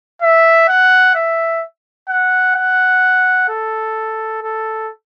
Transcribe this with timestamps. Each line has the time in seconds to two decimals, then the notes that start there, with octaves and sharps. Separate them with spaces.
0.22 E5
0.69 F#5
1.15 E5
2.10 F#5
2.56 F#5
3.49 A4
4.43 A4